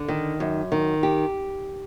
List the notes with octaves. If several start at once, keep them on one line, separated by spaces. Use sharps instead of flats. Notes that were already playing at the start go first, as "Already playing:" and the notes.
Already playing: D3
D#3
F#2
D#3
G4